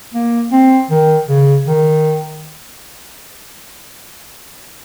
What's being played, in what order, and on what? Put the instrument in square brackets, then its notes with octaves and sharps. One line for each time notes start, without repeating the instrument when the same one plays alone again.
[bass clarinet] A#3
C4
D#3
C#3
D#3